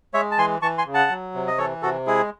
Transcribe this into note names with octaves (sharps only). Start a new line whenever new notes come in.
G#3 C#5 E5
A5
E3 G#5 C6
E3 A5 C#6
G#5 C6
C#3
F#5 A5
F#3
C3
D#5
E3 A4 C#5
C3 F#4 A4
G#3 E4 G#4